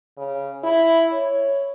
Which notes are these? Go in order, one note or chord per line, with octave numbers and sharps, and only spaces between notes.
C#3
E4
C#5